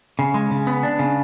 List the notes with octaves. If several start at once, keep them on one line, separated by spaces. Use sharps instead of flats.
C#3
G#3
C#3
B3
D4
C#3